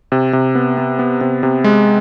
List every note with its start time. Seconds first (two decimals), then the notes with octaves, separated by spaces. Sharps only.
0.12 C3
0.33 C3
0.55 B3
0.78 B3
0.99 B3
1.21 C3
1.43 C3
1.64 G#3